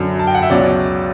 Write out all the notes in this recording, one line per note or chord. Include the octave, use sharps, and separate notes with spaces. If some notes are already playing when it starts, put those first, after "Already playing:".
Already playing: F#2 D3 F#3
A5
G5
F#5
E5
C#2 B2 F#3 C#4 D5